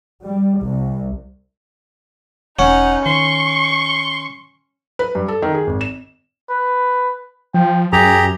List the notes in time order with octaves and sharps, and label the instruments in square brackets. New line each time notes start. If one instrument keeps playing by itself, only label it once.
[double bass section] G3
C2
[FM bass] E1 [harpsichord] C#4 [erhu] D#4 [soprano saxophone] F#5
[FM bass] D#3 [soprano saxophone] C6 [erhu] C#6
[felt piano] B4
G2
A4
D#3
G#4
G#1
E7
[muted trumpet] B4
[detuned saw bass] F3 [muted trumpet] G5
[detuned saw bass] F#2 [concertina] G4 A#5 [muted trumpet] G#4